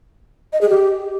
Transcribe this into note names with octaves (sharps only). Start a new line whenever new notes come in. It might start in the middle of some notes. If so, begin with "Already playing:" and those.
D#5
G#4
G4